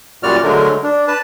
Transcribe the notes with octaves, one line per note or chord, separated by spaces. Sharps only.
F#2 A#2 G3 F#4 D5 F6
D3 F#3 G#3 A3 A#4
D4
B4 A5